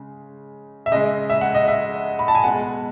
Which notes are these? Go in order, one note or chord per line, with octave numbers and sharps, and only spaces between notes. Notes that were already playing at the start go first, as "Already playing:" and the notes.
Already playing: C#3 G#3
E5
C#3 G#3 D#5
E5
F#5
D#5
E5
B5
A5
G#5
B2 G#3 F#5